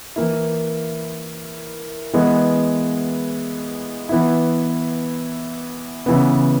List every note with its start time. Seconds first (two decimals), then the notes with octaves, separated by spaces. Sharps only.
0.16 E3 A#3 E4
2.13 E3 G#3 B3
4.09 E3 B3 E4
6.06 C#3 E3 B3